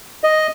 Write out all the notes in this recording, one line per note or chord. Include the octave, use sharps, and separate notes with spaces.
D#5